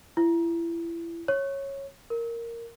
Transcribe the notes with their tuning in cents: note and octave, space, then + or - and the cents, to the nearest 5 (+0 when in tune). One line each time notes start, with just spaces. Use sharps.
E4 +30
C#5 -10
A#4 -5